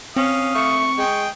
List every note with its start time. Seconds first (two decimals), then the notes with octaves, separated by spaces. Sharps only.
0.16 C4 C#4 F5 D#6
0.55 A3 C#6
0.98 G#3 G#4 G5